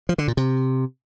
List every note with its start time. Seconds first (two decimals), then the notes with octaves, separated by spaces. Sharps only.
0.09 F3
0.18 D3
0.28 A#2
0.37 C3